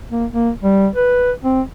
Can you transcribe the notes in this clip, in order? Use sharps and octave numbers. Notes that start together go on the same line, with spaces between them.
A#3
A#3
G3
B4
C4